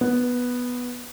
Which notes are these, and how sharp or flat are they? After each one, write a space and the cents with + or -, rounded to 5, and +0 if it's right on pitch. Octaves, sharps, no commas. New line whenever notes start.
B3 -5